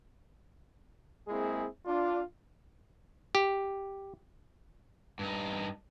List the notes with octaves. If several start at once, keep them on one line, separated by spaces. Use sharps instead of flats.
G#3 A#3 C4 E4 G#4
D4 F4
G4
G2 D#4